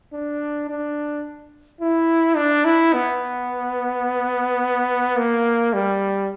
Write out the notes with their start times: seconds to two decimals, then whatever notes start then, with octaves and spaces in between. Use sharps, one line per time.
0.13 D4
0.69 D4
1.81 E4
2.37 D4
2.65 E4
2.94 B3
5.17 A#3
5.73 G3